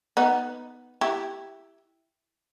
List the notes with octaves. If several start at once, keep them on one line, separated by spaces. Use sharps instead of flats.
B3 D#4
E4 G4